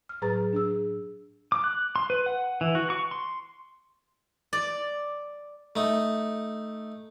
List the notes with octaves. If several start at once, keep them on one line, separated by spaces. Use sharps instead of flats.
F6
A2 F#3 G#4 B4 A#5 A6
D4 G#4 E6
D6
F#6
C6
B4
F#5
E3
F#4
C#6
C6
D5
A3 D#4